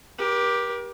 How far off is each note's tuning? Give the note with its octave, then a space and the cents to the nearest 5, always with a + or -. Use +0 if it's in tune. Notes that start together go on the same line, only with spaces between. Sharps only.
G4 +0 A#4 +40